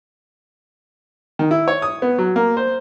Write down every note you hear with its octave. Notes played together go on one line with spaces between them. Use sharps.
D#3
E4
C#5
D#6
B3
F#3
A#3
C5